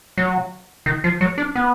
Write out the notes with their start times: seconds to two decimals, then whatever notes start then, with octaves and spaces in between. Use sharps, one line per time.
0.18 F#3
0.86 D#3
1.04 F3
1.21 F#3
1.38 D4
1.55 B3